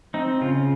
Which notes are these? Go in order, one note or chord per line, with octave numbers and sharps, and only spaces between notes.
C4 D#4
C#3 F4